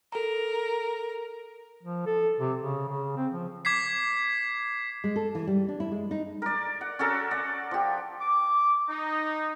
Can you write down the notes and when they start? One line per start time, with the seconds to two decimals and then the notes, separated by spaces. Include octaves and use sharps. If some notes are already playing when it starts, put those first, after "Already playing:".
0.12 A4 A#4 A#5
1.83 F3
2.06 A4
2.40 C3
2.60 C#3
2.89 C#3
3.16 C4
3.31 F3
3.65 D6 G#6 B6 C7
5.04 G#3
5.16 A4
5.35 E3
5.47 G3
5.68 D4
5.80 E4
5.92 G#3
6.11 D#4
6.42 A#4 D5
6.81 F#5
6.99 C#4 F#4 A4 A#4
7.31 D5 F#5
7.71 F3 G4
8.20 D6
8.89 D#4